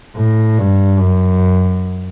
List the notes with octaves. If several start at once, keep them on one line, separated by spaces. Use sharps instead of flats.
A2
G2
F#2